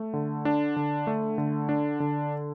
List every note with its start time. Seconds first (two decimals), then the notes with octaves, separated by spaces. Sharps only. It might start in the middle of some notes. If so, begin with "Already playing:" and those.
Already playing: A3
0.14 D3
0.45 D4
0.76 D3
1.07 A3
1.38 D3
1.69 D4
2.00 D3